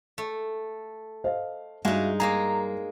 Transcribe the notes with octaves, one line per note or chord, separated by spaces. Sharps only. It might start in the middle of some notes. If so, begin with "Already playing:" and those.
A3
C5 D#5 F5
G2 G#3 D#4 F#4 E5 F5
G#3 A#3 G#4 A#5